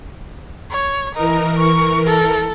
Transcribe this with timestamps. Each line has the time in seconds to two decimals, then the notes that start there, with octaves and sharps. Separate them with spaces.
0.71 C#5
1.15 E3 D#4 A#4
1.58 C#6
2.07 A4